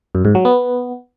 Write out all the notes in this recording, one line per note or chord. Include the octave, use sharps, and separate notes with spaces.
F#2
G#2
F#3
B3